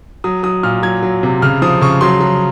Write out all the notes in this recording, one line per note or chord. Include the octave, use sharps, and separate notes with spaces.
F#3 D#6
F#3 D#6
A#2 F6
F#3 G#6
F#3
C3
C#3 F6
F3 D#6
C#3 C#6
F#3 C6
F#3